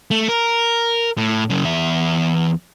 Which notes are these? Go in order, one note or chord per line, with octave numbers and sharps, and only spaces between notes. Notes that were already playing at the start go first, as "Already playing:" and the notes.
A3
A#4
A2
F#2 C#3
E2 E5